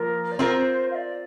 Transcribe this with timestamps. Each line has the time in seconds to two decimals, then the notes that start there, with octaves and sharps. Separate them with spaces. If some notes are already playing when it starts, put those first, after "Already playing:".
Already playing: F3 A#3 A#4
0.32 D5
0.39 C4 F4 A#4 C5
0.91 F5
0.95 D5